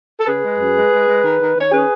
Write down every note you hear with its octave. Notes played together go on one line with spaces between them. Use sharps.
A4
C#3 G#4 B4
G#3
F#2
G#3
G#3
G#3
D#3
D#3
D#3 C#5
C#4 G#4 B4